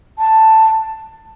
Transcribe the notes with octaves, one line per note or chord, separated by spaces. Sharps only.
A5